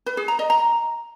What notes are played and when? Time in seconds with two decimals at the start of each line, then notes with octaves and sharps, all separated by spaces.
0.06 B4
0.17 G#4
0.28 A#5
0.39 D#5
0.50 A#5